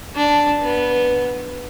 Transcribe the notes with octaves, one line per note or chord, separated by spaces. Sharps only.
D4
B3